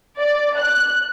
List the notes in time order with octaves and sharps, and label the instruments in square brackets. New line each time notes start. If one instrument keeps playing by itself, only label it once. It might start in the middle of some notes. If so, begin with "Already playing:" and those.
[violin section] D5
F#6